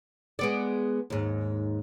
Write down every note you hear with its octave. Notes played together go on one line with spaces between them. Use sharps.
G#3 B3 D5
D#2 G#2